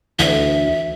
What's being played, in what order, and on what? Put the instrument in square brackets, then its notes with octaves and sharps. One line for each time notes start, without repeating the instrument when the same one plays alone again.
[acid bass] D2 [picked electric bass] E3 [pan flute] E5